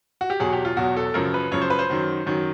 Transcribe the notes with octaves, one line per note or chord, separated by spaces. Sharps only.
F#4
G4
E2 B2 F#3 G#4
G4
F4
E2 B2 F#3 F#4
A4
F#2 C#3 F3 A#4
B4
F#2 C#3 F3 C#5
C5
B4
C5
F#2 D#3 F#3
F#2 D#3 F#3